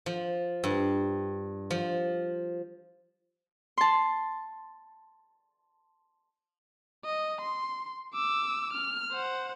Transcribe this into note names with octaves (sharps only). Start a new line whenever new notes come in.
F3
G2
F3
A5 C6
D#5
C6
D6 E6
F6
C5 F#5